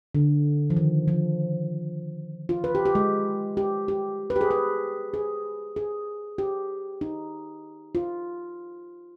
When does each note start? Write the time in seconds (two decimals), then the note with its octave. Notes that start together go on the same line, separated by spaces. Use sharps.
0.15 D3
0.70 F3
0.77 D#3
1.08 F3
2.49 F4
2.64 B4
2.75 G4
2.86 G4
2.95 G#3
3.57 G4
3.88 G4
4.30 B4
4.36 G4
4.41 G#4
4.51 B4
5.14 G#4
5.76 G#4
6.38 G4
7.01 D#4
7.95 F4